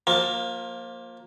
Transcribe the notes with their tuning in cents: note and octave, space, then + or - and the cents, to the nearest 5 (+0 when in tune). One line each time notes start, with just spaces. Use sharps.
F3 +20 A#3 +0